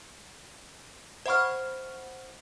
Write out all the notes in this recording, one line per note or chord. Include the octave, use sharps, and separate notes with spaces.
C5 E5 F#5 B5 C#6 F6